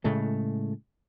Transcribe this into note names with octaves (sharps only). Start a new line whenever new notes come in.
A2 C#3 G#3 A3